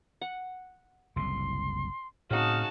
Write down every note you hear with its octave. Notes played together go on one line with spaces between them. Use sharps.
F#5
F#1 C2 A2 C6
A2 C#3 C4 D#4 F#4 A5 F6